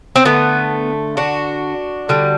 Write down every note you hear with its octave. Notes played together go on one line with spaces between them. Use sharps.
C4
D3 A3 B3
D4 F#4
D3 G3